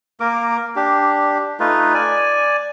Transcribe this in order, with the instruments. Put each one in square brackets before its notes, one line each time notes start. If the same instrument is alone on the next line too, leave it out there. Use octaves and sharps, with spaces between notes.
[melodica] A#3 A#4 D6
D4 G4
A3 D#4 F4 B4
D5 G#5